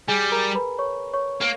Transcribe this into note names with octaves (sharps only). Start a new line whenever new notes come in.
G3 G#4 G#5
A#4 A#5
B4 B5
C#5 C#6
C#5 C#6
A#3